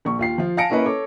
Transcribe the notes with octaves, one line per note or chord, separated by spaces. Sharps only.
A#1 C#6
D#2 F4 C7
F3 F4
F5 G#5 A5 A#6 C#7 D7
A#3 C#4 E4 A#4 B4 D#5
A4 C#5 D6